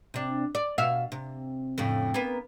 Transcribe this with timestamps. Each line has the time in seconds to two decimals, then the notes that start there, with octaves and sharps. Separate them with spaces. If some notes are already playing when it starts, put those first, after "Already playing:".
0.14 C3 D4
0.55 D5
0.78 B2 E5 F5
1.12 C3
1.78 F2 A2 C#3
2.14 A#3 B3